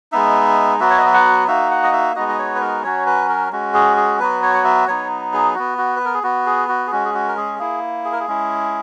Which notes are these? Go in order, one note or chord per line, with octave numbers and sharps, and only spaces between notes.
G#3 B3 D#4 E5
F#3 B3 F#4 E5
C#5
D#5
E5
F#5
A#3 D#4 F#4 E5
F#5
D#5
E5
G#3 B3 D#4 F#4 D#5
D#5
C#5
B4
A#4
F#3 C#4 F#4 C#5
B4
A#4
G#3 C#4 F#4
G#4
G#4
F#3 B3 F#4 B4
C#5
F#5
E5
F#3 B3 D#4 C#5
G#4
B3 F#4
F#4
B4
A#4
G#4
B3 F#4
G#4
F#4
G#4
G#3 C#4 F#4
G#4
F#4
A#4
G#4
A#3 E4 G#4
G#4
A#4
G#4
G#3 C#4 E4